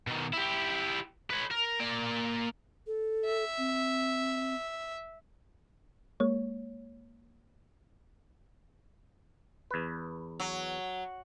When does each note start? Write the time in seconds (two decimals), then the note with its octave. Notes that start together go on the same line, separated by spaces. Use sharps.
0.07 B2 D#3
0.33 E4 G4
1.30 B4 C#5
1.51 A#4
1.79 A#3 D5
2.87 A4
3.26 E5
3.58 C4
6.20 G#3 A#3 C#5
9.71 E2 B4
10.40 F#3